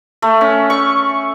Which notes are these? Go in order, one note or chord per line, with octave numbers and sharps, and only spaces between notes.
A3
C#4
C#6